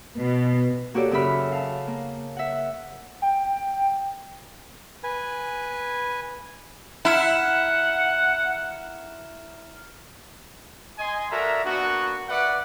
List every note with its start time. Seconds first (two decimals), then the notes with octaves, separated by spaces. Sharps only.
0.17 B2
0.94 A#3 F#4 G4 A4 C#5 D5
1.11 F#2 C#3 C#4 E5 B5 F6
1.52 F5 A5
1.87 A#3
2.37 E5 F#5
3.22 G5
5.04 B4 G#5
7.05 E4 F#5 A#5 F6 E7
10.99 D#5 G#5 C6
11.30 F#4 A4 A#4 D5 E5 A#5
11.63 A#3 B3 D4 F#4
12.28 B4 D5 E5 F#5